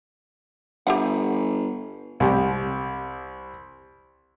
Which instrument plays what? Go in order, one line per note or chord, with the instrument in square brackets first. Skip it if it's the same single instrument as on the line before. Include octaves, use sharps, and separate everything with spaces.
[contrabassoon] G1 [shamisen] G4 E5 F#5
[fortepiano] C2 G4